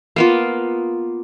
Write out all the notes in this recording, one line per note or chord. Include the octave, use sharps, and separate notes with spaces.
A#3 B3 F4